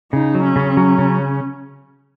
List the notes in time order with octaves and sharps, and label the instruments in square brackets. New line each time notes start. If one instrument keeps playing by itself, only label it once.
[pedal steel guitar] C#3 [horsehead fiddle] D#4
[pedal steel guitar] F#3
[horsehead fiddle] C#4
[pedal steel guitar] C#3
F#3
C#3